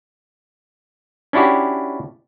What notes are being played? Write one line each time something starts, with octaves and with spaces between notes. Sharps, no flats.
C#4 D4 E4 F#4 G4